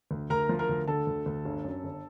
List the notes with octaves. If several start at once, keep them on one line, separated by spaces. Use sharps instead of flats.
D2
D2 A#4 A#5
F3
A#4 A#5
D2
D3 A4 A5
D2
D2
G1
F#2
G1